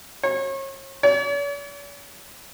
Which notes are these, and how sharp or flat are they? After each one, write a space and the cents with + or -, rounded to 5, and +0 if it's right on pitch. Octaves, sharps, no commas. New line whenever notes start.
C#5 -35
C#5 +45